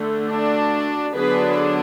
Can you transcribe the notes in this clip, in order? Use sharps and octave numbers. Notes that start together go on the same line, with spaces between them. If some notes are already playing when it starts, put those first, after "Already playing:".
Already playing: D3 A3
D4 F#4
D3 F#3 B3 D4 G#4 B4